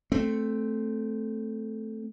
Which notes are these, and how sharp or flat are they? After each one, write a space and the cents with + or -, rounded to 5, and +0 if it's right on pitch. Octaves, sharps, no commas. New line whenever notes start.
A3 +0 C4 +0